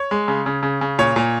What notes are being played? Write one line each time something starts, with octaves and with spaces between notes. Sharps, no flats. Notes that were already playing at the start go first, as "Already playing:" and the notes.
Already playing: C#5
G#3
C#3
C#3
C#3
C#3
A#2 C#5
A#2